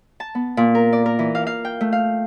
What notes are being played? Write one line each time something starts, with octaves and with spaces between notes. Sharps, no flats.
A5
B3
A#2
A#4
D5
A#4
E3
F5
F5
G5
A3
F5